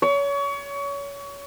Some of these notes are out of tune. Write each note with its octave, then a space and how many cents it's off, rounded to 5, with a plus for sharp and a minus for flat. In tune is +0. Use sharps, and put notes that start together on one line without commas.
C#5 +30